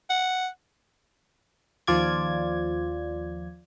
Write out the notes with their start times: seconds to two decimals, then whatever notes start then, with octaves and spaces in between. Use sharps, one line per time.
0.10 F#5
1.87 D#2 F3 F4 D5 G#6